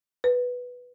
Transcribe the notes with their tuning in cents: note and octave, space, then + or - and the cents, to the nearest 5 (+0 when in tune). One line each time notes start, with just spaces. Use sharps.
B4 -5